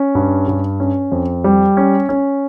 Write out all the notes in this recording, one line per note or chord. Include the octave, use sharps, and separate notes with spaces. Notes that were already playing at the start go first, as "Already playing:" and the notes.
Already playing: C#4
G2
G2
C#4
F2
G3
C#4
C#4